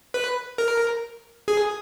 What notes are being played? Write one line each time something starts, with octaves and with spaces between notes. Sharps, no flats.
B4
A#4
G#4